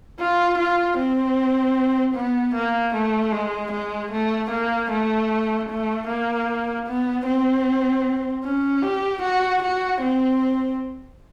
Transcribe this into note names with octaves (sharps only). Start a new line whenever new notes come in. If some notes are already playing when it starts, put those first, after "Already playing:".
F4
F4
C4
B3
A#3
A3
G#3
G#3
A3
A#3
A3
A3
A#3
B3
C4
C#4
G4
F#4
F#4
C4